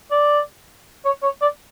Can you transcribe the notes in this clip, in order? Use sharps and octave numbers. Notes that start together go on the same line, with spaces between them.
D5
C#5
C#5
D5